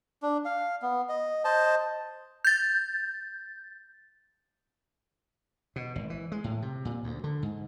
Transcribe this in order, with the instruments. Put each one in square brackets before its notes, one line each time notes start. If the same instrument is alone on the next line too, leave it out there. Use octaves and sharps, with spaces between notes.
[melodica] D4
F5
B3
D#5
C5 D#5 A5
[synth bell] G6 A6
[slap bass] B2
G#1
E3
G#3
A2
C3
A#2
D2
D3
G#2